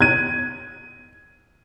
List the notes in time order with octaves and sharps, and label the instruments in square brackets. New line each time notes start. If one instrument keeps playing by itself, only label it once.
[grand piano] G#6 D#7